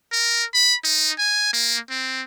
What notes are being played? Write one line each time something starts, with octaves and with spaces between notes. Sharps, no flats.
A#4
B5
D#4
G#5
A#3
C4